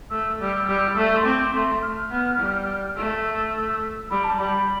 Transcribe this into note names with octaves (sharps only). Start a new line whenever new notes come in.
A3 E6
G3
G3
A3
C6
C4 D6
A3 C6
F6
B3
G3
A3 E6
G3 B5
A5
G3 B5